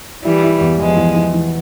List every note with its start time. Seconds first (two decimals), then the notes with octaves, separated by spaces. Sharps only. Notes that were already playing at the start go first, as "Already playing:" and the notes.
0.25 E3 G3 E4
0.43 E4
0.61 E2
0.79 E2 F3 G#3
0.97 E2
1.15 E3
1.33 E3